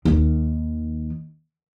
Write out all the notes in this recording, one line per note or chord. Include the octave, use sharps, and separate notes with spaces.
D#2 D#3